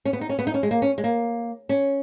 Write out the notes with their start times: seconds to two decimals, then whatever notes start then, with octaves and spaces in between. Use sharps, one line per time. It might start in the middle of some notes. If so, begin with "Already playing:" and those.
0.05 C#4
0.13 B3
0.21 D#4
0.29 C#4
0.39 B3
0.47 D#4
0.54 C#4
0.63 G#3
0.71 A#3
0.82 C#4
0.98 G#3
1.04 A#3
1.69 C#4